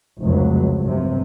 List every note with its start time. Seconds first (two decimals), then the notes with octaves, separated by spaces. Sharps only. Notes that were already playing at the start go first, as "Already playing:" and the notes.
0.23 F1 C#2 F#3
0.81 G1 C3